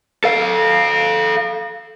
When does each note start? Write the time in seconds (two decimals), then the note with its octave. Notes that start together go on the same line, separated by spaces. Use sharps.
0.24 A4 F5